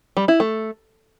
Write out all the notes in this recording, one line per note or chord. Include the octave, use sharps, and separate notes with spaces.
G3
E4
A3